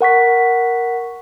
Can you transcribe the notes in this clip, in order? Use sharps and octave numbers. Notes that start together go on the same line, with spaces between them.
A#4 F#5 C#6 B6